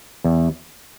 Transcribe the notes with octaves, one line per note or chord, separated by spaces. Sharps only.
E2